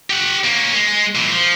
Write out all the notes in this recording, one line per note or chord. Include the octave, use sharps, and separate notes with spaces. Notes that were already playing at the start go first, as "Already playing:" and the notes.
G4 F#5
A#3 C#4
G#3
A#2 E3
F3